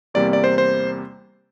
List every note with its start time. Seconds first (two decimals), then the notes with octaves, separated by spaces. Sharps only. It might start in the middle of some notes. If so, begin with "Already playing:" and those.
0.14 E2 C3 G3 A#3 D5
0.33 D5
0.44 C5
0.58 C5